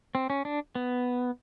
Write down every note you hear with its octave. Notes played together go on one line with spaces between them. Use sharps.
C4
C#4
D4
B3